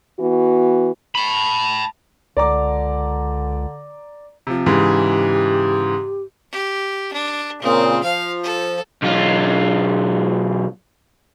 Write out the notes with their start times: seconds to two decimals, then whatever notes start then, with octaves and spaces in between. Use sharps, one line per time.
0.19 E3 B3 F#4
1.15 A5 B5
2.37 C#2 D3 D5 A#5 D6
4.47 C3 F3
4.66 G#2 C#3 E3 G4
6.52 G4
7.13 D4
7.62 A#2 C#3 C4
8.03 F3 F5
8.43 A4
9.02 B1 F4